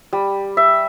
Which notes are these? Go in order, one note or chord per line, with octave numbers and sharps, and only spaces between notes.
G3
E5